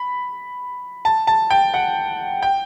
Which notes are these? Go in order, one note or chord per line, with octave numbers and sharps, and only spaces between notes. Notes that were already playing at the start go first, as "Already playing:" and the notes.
Already playing: B5
A5
A5
G5
F#5
G5